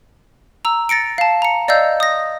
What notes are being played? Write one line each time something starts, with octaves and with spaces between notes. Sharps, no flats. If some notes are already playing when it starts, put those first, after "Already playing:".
A#5 E6
A6 A#6 C#7 D7
F5 A5
A#5 C#7
D5 D#5 F5 E6 G6
D#6 A#6